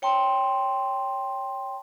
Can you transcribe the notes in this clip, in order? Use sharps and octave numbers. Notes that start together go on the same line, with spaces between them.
C#5 G5 A5 C6